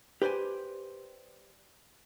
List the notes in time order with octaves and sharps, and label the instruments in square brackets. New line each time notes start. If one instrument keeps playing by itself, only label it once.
[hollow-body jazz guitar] G4 B4 C5 D5 G#5